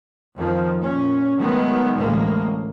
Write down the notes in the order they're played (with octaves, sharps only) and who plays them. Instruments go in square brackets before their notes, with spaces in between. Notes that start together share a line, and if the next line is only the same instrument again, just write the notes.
[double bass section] F2 D#3 F3
A#2 C#4
D#3 F#3 G#3 A3 B3
A1 D2 A2 G#3 A#3